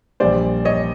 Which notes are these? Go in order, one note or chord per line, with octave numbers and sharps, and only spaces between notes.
A#1 A#2 G3 C5 D5
C#5 D#5